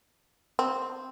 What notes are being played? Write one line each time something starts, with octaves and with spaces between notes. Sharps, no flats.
C4